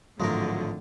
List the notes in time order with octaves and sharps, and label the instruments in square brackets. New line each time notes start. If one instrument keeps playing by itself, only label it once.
[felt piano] G#1 F3 [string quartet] A2 D3 [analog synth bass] F#3 [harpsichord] G#3 A3 A#4